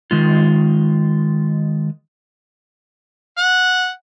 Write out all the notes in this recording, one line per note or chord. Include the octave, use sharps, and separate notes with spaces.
D#3 G#3 F4
F#5